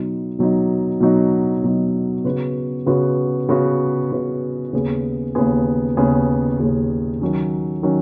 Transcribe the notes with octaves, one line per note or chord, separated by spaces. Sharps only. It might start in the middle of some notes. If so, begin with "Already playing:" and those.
Already playing: B2 F#3 D#4
B2 F#3 D#4
B2 F#3 D#4
B2 F#3 D#4
C#3 B3 F#4 B4
C#3 B3 F#4 B4
C#3 B3 F#4 B4
C#3 B3 F#4 B4
D#2 C#3 B3 G#4
D#2 C#3 B3 G#4
D#2 C#3 B3 G#4
D#2 C#3 B3 G#4
D#3 F#3 C#4
D#3 F#3 C#4